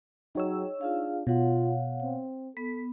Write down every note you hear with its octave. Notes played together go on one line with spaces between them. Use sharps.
F#3 D#4 G#4 C#5 G5 E6
D4 F4 G#4 F5
B2 F4 C#5 F5 F#5
C4
B3 A4 B6